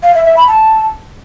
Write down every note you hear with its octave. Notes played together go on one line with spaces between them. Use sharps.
F5
E5
E5
B5
A5